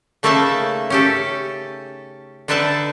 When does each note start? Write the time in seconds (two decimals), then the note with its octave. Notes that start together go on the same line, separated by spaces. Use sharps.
0.23 C#3 A3 A#3 D#4 E5 A5
0.90 C#4 G4 A4
2.48 D3 D4 D#4 B4 E5 A5